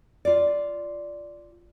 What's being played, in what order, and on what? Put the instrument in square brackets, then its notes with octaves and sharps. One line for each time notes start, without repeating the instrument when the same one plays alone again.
[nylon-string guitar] F4 D5